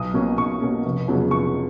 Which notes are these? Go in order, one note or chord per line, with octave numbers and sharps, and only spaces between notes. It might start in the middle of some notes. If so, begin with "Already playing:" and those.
Already playing: B1 D#6
B2 A#3 C#4
B1 C#6
B2 A#3 C#4
F1
F2 C#3 F#3 B3
F1 C#6